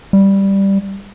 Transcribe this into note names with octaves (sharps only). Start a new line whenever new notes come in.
G3